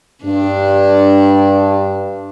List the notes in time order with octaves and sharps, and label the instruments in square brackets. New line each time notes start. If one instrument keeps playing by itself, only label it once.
[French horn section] G2 [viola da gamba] D4